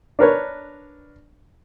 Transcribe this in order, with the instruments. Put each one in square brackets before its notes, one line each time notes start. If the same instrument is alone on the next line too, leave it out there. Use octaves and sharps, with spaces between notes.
[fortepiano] D4 A#4 B4 C#5